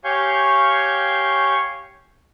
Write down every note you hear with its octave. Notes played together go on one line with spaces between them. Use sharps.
G4 C#5 F5 G#5 C#6 G6